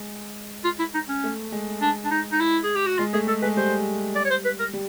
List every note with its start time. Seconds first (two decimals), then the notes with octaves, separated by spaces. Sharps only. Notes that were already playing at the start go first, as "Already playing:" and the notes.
Already playing: G#3
0.64 F4
0.79 E4
0.94 D#4
1.08 C#4
1.24 A3
1.52 G#3
1.81 D4
2.05 D4
2.11 D#4
2.32 D#4
2.40 E4
2.64 G#4
2.75 G4
2.86 F#4
2.98 G#3 F4
3.13 A3 G#4
3.27 G#3 A4
3.42 G#3 B4
3.57 G3 C5
4.15 D5
4.25 C#5
4.30 C5
4.45 B4
4.59 A#4
4.73 G3